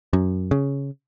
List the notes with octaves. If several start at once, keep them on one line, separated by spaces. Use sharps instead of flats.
F#2
C#3